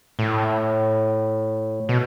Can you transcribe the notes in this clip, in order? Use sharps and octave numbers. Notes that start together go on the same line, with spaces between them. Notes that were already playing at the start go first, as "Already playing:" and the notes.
A2
B2